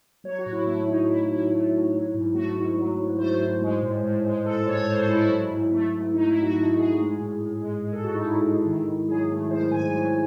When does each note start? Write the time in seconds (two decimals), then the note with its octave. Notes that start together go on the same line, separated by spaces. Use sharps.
0.24 F#3 C#5
0.39 F#4
0.46 A2
0.53 E4
0.67 A3 E4
0.87 A2 D#4
1.09 F#3 E4
1.30 A2 E4
1.51 A3
1.72 A2
1.93 F#3
2.14 G#2
2.34 A3 F#4
2.55 G#2
2.77 F#3
2.98 G#2
3.19 A3 C5
3.40 G#2
3.62 G#3
3.82 A2
4.04 A2
4.24 G#3
4.45 G#3 A4
4.56 A4
4.67 A2 C#5
4.77 C#5
4.88 A2 C5
4.98 A4
5.08 G#3 E4
5.20 E4
5.29 F#3
5.51 G#2
5.72 A3
5.93 G#2
6.14 F#3 D#4
6.28 E4
6.34 G#2
6.42 F#4
6.56 A3 F#4
6.77 G#2 G#4
6.98 G#3
7.19 A2
7.40 A2
7.61 G#3
7.83 G#3
7.93 A4
8.03 A2 F#4
8.15 D#4
8.24 A2 E4
8.45 G#3
8.66 D#3
8.87 G#2
9.08 F#3 G#4
9.30 A3
9.51 D#3 C5
9.71 G#2 G#5
9.93 F#3